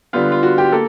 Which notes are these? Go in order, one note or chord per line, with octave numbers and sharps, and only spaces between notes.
D3 G3 B3 F4
F4
F#4
G4
A#3 A4